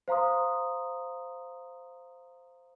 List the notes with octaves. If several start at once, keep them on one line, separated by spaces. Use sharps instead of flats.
C5 F5 A#5 C6 D#6